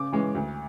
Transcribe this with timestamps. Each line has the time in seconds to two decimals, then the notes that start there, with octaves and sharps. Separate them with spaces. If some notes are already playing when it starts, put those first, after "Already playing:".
Already playing: C#3 D6
0.12 E3 G#3 C#4
0.35 D2